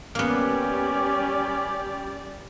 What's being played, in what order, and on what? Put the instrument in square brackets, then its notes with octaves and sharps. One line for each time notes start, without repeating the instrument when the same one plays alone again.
[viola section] G3 D5 [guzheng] A#3 B3 [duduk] C#4 [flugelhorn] G4